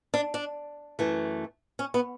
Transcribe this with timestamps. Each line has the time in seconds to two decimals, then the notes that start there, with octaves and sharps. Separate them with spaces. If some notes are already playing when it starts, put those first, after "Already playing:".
0.14 D4
0.34 D4
0.99 F#2 E3 A3
1.79 C#4
1.94 B3